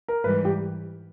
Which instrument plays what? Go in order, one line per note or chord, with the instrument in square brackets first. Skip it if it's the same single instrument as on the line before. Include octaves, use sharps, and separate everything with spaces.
[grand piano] A#4
[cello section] G#2 E3 G3 [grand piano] B4
[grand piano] G4